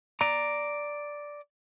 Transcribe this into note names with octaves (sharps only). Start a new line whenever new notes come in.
D5 A#5